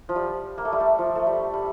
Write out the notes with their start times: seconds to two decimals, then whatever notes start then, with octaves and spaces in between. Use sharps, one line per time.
0.09 F3
0.16 G3
0.58 A#3
0.65 A3
0.72 G3
0.80 A3
0.99 F3
1.16 A3
1.27 G3
1.54 G3